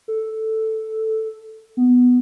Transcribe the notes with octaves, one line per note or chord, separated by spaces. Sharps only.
A4
B3